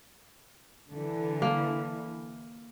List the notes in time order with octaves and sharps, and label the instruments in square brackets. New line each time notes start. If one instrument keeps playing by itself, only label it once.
[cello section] D3 E3
[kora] A#3